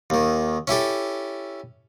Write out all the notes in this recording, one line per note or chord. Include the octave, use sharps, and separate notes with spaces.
D#2 D#3
C#4 E4 G4 A4